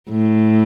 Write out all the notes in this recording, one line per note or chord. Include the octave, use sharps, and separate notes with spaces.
A2